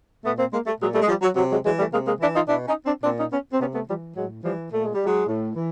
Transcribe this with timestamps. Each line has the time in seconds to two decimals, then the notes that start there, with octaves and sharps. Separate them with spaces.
0.24 A#2 A3 B3
0.38 A#3 C4
0.52 G#3 A#3
0.66 G3 A3
0.80 A#2 F#3 G#3
0.94 G3 A3
1.02 G#3
1.08 F3 G3
1.22 F#3
1.36 C3 F#3
1.50 F#3 G#3
1.64 E3 F#3 G#3
1.78 G3 A3
1.92 C3 G#3 A#3
2.06 G#3 A#3
2.20 E3 D4 E4
2.33 D#4 F4
2.48 B2 D4 E4
2.67 C#4 D#4
2.85 C4 D4
3.04 A#2 C4 D4
3.18 C#4 D#4
3.32 B3 C#4
3.52 C4
3.59 C3 B3 C#4
3.74 A3 B3
3.87 E3 F3 G3
4.15 A2 F#3 G#3
4.43 E3 F3 G3
4.71 A#2 A3
4.83 G#3
4.94 G3
5.06 F#3 G#3
5.27 A2
5.55 E3